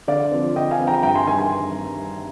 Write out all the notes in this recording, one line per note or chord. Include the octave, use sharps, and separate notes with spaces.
D3 D5 F5
F3 C4
D3 D#5 G5
F5 G#5
F3 C4
G5 A#5
G2 G5 A#5
G#5 C6
D#3 G3 G#5 C6
G#5 C6